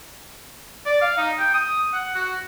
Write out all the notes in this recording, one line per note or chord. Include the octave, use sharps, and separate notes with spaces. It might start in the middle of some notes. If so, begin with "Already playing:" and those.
D5
F5
D#4
G5
D#6
F#5
F#4